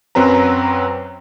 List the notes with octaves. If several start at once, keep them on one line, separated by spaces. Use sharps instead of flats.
F#2 F#3 C4 B4 A#5